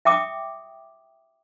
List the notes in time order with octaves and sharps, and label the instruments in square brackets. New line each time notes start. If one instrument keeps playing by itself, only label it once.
[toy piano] E5 G5 D6 D#6